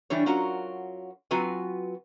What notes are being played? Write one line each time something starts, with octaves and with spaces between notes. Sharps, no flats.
E3 G3 D4 C#5
F#3 C#4 F4 F#4 A#4
F#3 C4 F4 F#4 B4 G#5